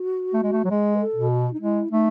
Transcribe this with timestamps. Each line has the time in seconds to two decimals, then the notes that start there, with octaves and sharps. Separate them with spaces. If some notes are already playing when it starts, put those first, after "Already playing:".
Already playing: F#4
0.33 A3
0.43 G#3
0.52 A3
0.65 F#3
0.70 G#3 G#4
0.96 B4
1.00 A4
1.16 B2
1.31 F#4
1.53 D#4
1.61 G#3 E4
1.91 A3 D#4